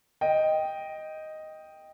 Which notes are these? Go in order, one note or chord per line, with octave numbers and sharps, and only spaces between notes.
D#5 G5